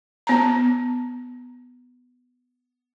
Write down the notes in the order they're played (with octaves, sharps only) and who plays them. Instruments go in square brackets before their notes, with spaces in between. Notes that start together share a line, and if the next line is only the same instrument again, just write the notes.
[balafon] B3 A#5